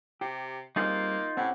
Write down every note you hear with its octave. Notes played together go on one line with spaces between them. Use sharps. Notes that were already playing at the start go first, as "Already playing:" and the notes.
C3 G4
G3 A#3 C4 D#4 F4 G#4
A2 C4 C#4 G4 F#5